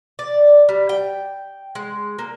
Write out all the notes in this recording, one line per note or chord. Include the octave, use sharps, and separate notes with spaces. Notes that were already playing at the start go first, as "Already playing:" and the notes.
D5
G3
G5
G#3
A#3